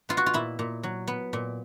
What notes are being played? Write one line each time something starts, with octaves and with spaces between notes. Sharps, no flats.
B3 F4
F#4
F4
A#2 E4
A#2
F#3
B3
A#2